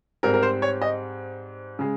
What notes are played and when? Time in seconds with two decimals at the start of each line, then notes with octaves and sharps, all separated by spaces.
0.23 G#2 G3 C4 A#4
0.34 A#4
0.43 C5
0.62 C#5
0.82 D#5
1.79 C#3 G#3